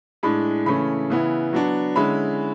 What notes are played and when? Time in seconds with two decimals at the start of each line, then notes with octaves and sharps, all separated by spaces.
0.23 A2 G#3 D4 B5
0.66 C#3 E3 A3 C#4 B5
1.10 C#3 E3 B3 E4
1.53 F#3 B3 D4
1.96 D3 G#3 C#4 E4 B5